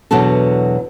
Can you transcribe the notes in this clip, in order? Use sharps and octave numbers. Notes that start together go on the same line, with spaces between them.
E2 B2 E3 F#3 D4 A4